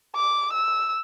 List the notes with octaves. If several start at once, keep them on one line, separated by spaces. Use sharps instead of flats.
D6
E6